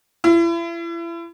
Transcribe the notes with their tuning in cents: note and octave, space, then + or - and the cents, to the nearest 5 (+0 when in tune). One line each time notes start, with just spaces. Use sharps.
E4 +35